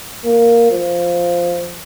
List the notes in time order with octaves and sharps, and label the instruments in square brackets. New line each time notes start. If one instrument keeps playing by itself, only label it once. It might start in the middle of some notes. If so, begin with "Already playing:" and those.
[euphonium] A#3
F3